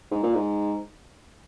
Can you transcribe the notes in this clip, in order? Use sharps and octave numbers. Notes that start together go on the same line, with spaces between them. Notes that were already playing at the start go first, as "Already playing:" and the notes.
G#2
A#2
G#2